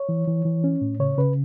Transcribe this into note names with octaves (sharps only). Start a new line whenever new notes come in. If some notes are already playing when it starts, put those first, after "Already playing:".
Already playing: C#5
E3
E3
E3
C#4
A2
C#3 C#5
C#3 B4